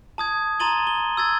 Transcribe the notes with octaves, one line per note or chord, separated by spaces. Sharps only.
A5 D#6 G#6
A#5 C6 A6 D#7 F#7 G7
G7
E6 G#6 A6